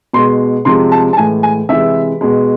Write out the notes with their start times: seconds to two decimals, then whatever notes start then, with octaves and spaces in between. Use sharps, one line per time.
0.13 B2 G#3 C6
0.65 C3 F3 G#3 C6
0.92 A5
1.13 A5
1.17 A2 E3 G#3 G#5
1.43 G#5
1.69 C3 E3 G#3 E5
2.21 B2 G#3